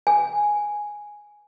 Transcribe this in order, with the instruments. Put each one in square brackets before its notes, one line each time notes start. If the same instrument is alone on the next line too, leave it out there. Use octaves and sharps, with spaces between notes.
[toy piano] G#5